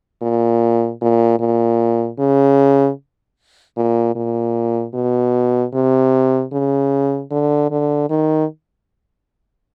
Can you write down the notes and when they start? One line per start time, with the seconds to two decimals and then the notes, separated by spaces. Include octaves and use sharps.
0.22 A#2
1.01 A#2
1.40 A#2
2.19 C#3
3.77 A#2
4.15 A#2
4.94 B2
5.74 C3
6.52 C#3
7.31 D3
7.71 D3
8.09 D#3